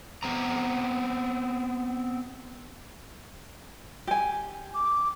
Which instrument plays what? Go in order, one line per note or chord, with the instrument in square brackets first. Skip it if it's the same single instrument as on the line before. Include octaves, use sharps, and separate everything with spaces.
[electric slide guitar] B3 C4 A#5
[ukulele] G4 G#5
[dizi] D6